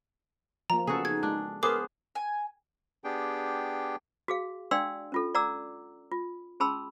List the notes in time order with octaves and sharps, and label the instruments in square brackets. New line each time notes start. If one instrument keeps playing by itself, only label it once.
[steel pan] F3 A#3 [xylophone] A#5
[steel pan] C#3 B3 A4 [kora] F#4 G#4
[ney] D#4 [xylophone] G#6
[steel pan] G#3 [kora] D4
[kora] B3 G#4 C5 [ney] A#4 [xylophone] D6
[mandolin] G#5
[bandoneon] B3 D4 G4 G#4 G5
[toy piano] F#4 G#4 F5
D4 D5 F5 G5 C6 E6
C#4 F4 A4
D5 F#5 A#5 D6 E6
F4
C#4 G#4 A5 B5 C6 E6